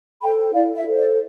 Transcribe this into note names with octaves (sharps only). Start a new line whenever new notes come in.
A4 C5 G5 B5
E4 D5 F5
E5
A4 C5
D5